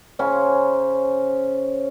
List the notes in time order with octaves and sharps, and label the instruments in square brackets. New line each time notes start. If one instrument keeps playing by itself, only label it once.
[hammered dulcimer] C#3 C#4 C5 G#5